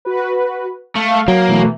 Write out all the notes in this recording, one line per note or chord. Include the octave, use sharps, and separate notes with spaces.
F#4 B4
A3 F5
F#3 A#3
B2 E3 A3